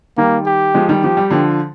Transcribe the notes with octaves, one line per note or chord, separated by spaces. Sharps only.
D#3 G3 A#3
G4
F3 G#3
D#3 G3
F3 G4
G3
D3 F3